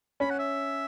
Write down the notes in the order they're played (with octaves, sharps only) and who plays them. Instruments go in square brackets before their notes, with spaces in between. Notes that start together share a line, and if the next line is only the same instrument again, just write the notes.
[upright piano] C#4 [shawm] B5
[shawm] F#5
E5